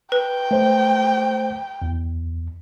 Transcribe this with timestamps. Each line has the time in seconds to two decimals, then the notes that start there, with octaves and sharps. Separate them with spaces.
0.12 B4 G5
0.51 A3 C5
1.82 E2